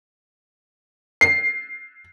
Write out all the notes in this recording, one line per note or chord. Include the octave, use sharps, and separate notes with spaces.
C7